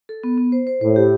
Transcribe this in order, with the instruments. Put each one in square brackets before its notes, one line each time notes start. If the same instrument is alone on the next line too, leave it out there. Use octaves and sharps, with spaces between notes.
[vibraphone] A4
B3
B3
C5
C5
[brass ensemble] A2 [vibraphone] C5
[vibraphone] G4